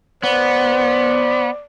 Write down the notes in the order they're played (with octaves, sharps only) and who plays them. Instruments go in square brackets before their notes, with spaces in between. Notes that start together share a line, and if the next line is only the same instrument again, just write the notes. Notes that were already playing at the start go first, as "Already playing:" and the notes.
[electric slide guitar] B3 [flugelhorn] C5 [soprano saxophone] D5